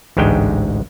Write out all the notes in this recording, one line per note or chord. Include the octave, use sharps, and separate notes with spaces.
A1 D2 G#2 G#3 G5